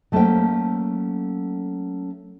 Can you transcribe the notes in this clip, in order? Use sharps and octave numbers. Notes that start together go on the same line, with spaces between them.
F#3 A3 A#3 C#4 C5 G5